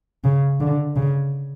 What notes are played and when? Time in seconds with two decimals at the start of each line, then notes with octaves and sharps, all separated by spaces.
0.24 C#3
0.60 D3
0.96 C#3